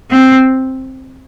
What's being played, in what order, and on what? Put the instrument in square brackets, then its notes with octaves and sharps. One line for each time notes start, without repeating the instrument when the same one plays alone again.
[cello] C4